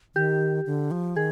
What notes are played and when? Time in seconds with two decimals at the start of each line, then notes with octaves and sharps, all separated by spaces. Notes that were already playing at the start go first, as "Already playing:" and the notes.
0.15 D#3 G4
0.66 D3
0.91 F3
1.16 D#3 G#4